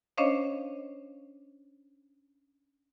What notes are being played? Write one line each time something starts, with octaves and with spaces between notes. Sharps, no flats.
C#4 D4 C5 C#5 D#5 F5